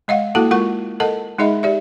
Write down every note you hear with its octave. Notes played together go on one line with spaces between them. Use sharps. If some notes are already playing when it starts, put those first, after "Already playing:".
G#3 D#5 F5 F#5
A#3 E4 F#4 A4 F#5 A5
G#3 F4 A#4 F#5 C#6
A4 A#4 D#5 F#5 A5
G#3 D#4 G#4 D#5 E5 B5
G4 D5 E5